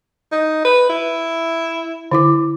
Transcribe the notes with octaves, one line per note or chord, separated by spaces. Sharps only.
D#4
B4
E4
D3 E4 D6